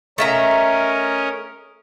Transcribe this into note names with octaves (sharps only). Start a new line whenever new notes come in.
A3 C#4 A#4 D#5 E5 A#5